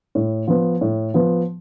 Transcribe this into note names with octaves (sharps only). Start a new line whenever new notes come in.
A2
F3 B3
A2
F3 B3